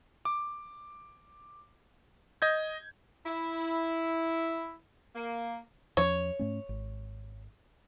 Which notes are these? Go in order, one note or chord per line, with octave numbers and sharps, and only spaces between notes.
D6
D#5 G6 G#6
E4
A#3
E2 F3 C#4 C#5
G#2 A3 C#4
G#1